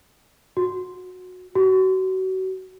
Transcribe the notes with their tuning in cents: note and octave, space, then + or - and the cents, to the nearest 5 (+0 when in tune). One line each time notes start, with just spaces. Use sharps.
F#4 -20
F#4 +30